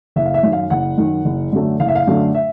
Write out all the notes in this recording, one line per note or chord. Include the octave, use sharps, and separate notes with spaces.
F#1 E5
F5
E5
F#2 D#3
F5
F#1 F#5
F#2 D#3
F#1
F#2 D3 F#3 A3
F#1 F5
E5
F5
F#2 D3 F#3 A3
E5